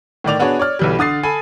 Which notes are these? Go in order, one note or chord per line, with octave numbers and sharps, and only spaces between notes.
A2 D#3 D5 F7
B3 D4 F#4 G#4 C#5
C#5 D5 F6
B1 E3 G3
D3 D#6 A6 C7
A4 G#5 B5